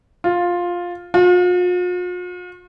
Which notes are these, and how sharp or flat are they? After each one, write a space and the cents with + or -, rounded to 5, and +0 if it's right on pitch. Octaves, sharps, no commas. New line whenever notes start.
F4 +10
F4 +45